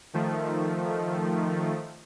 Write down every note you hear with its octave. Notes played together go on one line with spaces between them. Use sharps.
D#3 F3 A3